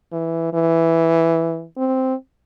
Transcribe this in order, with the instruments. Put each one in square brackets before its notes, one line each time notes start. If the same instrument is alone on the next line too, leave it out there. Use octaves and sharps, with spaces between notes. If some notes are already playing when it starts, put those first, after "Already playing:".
[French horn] E3
E3
C4